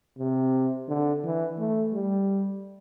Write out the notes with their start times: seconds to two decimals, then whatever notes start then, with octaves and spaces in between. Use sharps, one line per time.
0.18 C3
0.88 D3
1.24 E3
1.58 A3
1.93 G3